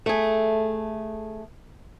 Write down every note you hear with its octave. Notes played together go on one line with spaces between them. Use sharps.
A3 G#4